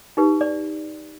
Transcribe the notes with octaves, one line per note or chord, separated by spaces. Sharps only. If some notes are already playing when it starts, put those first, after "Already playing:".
D#4 G4 B4
D5